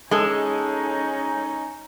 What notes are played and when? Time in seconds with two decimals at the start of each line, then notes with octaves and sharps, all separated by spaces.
0.11 G#3 C#4 D#4 A4